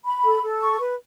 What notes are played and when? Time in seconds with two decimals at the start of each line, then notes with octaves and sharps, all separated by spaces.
0.05 B5
0.24 A4
0.42 A4
0.61 C#6
0.79 B4